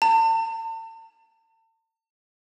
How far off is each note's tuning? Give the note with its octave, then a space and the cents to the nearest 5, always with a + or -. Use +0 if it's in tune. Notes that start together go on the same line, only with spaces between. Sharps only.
A5 +40